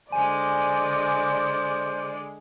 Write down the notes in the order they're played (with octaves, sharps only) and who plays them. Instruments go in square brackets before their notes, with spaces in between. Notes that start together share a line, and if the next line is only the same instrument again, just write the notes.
[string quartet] D3 G#3 [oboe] C5 [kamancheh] D5 [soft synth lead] G#5